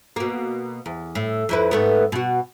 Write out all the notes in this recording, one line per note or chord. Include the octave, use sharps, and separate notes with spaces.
B2 A#3
E2
A2
F2 E4 B4
G#2 A3 B3
B2 F#4